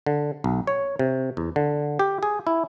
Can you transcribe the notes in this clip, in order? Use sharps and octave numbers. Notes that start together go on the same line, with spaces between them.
D3
B1
C#5
C3
E2
D3
G4
G#4
E4